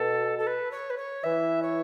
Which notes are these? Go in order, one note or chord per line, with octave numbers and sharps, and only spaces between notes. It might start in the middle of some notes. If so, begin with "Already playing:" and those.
Already playing: B2 A4
A4
B4
C#5
B4
C#5
E3 E5
C#5